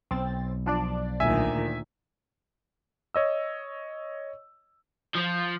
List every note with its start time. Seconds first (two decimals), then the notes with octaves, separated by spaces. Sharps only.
0.11 B1 C4 A6
0.66 F3 D4 D5
1.20 D2 A#2 D#3 E5 G#5
3.14 C#5 D#5 E6
5.15 F3